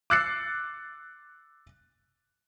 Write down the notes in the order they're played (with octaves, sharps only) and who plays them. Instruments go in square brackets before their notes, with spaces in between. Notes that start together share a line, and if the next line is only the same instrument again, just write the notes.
[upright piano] D6 E6 F#6 A6 C7 C#7